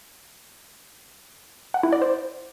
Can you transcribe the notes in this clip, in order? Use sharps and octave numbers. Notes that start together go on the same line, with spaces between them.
F#5
E4
D5
C5